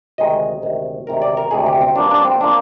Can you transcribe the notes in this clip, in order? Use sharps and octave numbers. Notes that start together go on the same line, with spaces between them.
D2 C3 D#3 G#3 D#5
D2 C3 D#3 G#3
D2 C3 D#3 G#3 A#4
D5
A#4
D2 C3 D#3 G#3 G#4
G4
C4
G2 F3 A#3 D4
D4
C4
F3 A#3 D4